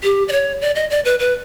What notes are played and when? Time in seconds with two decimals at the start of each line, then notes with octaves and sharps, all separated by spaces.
0.03 G4
0.28 D5
0.32 C#5
0.61 D5
0.75 D#5
0.90 D5
1.05 B4
1.19 B4